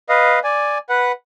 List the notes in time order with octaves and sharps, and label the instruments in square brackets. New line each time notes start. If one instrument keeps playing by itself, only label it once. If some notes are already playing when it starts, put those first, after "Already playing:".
[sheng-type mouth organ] B4 D#5 F5
D5 G#5
B4 F#5